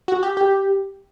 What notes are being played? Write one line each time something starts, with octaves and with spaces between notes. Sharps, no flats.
F#4
G4
G4